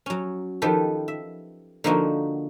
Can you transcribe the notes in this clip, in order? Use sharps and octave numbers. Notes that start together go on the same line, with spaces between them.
F#3 C#4
D#3 F3 G4 A4 B4
E5
D3 F3 A#3 D#4 F4 F#4